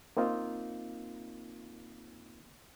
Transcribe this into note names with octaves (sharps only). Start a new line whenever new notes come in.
A#3 C4 D#4 F4